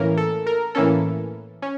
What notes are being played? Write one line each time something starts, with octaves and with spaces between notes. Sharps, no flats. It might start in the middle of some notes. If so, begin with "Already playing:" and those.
Already playing: A2 E3 A#3 C#4 A#4
A4
A#4
A2 E3 A#3 C#4 A4
C#4